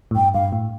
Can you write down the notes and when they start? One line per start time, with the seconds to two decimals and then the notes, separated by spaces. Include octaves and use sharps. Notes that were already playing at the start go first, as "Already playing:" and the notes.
0.11 A2
0.16 G2 G5
0.34 G2 F5
0.52 A2